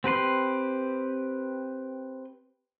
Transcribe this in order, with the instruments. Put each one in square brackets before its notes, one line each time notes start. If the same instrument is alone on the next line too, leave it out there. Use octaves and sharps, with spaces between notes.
[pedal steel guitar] C4 G4 B4 C6